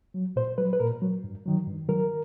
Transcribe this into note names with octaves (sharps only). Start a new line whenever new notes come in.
F#3
A#2 C5
F#3 B4
B4
A#2 A#4
F#3
G2
D#3 F#3
G2
D#3 F#3 A#4